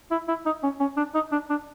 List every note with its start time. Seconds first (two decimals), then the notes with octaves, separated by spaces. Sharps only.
0.11 E4
0.28 E4
0.46 D#4
0.63 C#4
0.80 C#4
0.97 D4
1.15 D#4
1.32 D4
1.50 D4